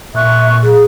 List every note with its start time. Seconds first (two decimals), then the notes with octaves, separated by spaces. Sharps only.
0.15 A#2 E5 C#6 F#6
0.63 G#4